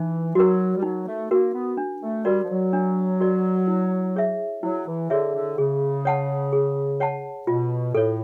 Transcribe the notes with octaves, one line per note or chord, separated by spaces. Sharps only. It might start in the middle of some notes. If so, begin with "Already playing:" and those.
Already playing: E3 D#4
F#3 F#4 A#4
G3
F#3 D#4
A3
A#3 F#4 A#4
B3
D4
A3
G3 F#4 A#4 D5
F3
F#3
D4
F#4 A#4 D5
E4
G#4 C#5 E5
F#3 E4
E3
D3 G#4 C#5 E5
D3
C#3 G#4
C#5 F#5 A5
G#4
C#5 F#5 A5
B2 F4
A2 A4 C#5